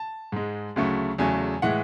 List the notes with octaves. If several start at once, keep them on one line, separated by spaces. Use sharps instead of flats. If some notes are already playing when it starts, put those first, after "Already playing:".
Already playing: A5
G#2 G#3
D2 C#3 F#3 A3
E2 C#3 F#3 A3 G#5
A2 E3 G#3 F#5